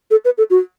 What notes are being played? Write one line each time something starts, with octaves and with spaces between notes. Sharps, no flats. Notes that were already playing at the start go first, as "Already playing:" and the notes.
A4
B4
A4
F#4